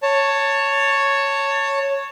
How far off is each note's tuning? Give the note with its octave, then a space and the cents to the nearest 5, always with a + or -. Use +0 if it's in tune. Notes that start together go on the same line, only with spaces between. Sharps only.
C#5 +0 A5 +20